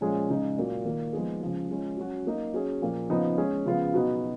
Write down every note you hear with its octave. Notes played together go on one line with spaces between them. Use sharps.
A#2 F3 G#3 C#4 G#4
C#3 G#3 D#4
A#2 F#3 A#3 F4
D#3 A#3 F4
F3 G#3 B3 D#4 G#4
C#3 F3 G#3
F3 G#3 C#4
F#3 C#4 F#4
F#3 A#3 D#4
F#3 C#4 G#4
A#2 F3 A#3
C#3 F3 B3 D#4
G#3 C#4 G#4
C#3 F3 B3 F4 G#4
B2 F#3 B3 D#4